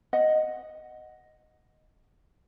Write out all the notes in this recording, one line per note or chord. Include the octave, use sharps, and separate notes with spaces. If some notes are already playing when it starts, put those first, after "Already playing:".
D#5 F#5